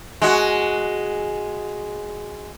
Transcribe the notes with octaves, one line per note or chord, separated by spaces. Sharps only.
G#3 F#4